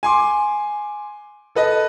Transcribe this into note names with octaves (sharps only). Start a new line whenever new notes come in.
G#5 C6 D6
A4 B4 D#5